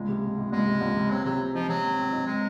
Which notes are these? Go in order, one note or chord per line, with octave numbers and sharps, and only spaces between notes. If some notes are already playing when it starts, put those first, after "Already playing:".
Already playing: C#2 G#3
C3
C3
C3
C#2 G#3
C3
C#2
C3
F#3 C4
C3 F#3
C4
F3 D#4
C3 F#3
C4
C4
D#4
G#3 C4